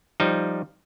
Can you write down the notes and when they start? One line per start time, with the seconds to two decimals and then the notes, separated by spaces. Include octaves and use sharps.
0.20 F3 G3 D#4